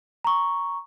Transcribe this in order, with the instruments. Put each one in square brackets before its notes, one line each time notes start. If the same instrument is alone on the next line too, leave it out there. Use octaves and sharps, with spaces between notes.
[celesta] A#5 C#6